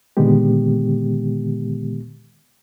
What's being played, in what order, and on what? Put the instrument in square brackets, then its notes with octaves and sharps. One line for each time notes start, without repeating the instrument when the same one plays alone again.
[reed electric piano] A#2 D3 D#3 G#3 B3 G4